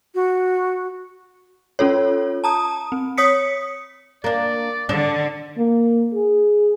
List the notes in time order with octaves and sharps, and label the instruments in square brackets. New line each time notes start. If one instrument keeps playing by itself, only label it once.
[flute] F#4
[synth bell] C#4 F4 A4 C#5
A5 A#5 D#6
C4
C#5 D#6 B6 C#7
[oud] A#3 D4 [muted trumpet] D5
[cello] D3 [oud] D4
[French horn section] A#3
G#4